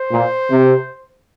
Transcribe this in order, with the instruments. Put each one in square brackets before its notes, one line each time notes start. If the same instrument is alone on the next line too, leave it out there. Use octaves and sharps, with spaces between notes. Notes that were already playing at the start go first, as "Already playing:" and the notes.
Already playing: [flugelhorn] C5
[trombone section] A#2
C3